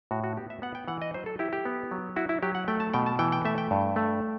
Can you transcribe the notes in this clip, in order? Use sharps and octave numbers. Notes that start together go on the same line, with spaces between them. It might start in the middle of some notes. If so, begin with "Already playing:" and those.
A2 F#4
F#4
B3 G4
E5
B3 F#5
G5
E3 F#5
D#5
F#3 C5
A4
E4 G4
G4
B3
F#3
E4 F#4
E4
F#3 G4
F#5
A3 G5
A5
B2 G5
A5
E3 G5
G5
A3 E5
G5
G2
A3